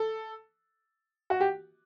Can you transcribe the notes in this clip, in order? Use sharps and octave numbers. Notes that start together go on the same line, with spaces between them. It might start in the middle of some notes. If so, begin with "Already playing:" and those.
Already playing: A4
F#4
G4